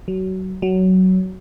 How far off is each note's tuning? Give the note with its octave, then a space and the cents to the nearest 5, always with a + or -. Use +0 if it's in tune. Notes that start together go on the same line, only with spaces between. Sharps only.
F#3 +25
F#3 +15